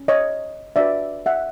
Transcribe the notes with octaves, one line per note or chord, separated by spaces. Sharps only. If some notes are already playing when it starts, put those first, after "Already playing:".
Already playing: C#4
C#5 D#5
D4 F#4 B4 D5 E5
E5 F#5